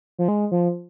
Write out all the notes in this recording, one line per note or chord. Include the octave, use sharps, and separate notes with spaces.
F3
G#3
F3